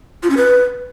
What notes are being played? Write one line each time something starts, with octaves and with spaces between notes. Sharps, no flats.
F4
C#4
B4